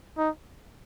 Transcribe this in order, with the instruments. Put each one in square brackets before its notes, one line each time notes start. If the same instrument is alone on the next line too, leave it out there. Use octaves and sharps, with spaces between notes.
[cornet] D#4